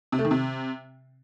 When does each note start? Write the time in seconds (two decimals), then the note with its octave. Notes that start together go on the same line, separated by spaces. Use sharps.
0.12 C3
0.19 A3
0.25 D#3
0.31 C3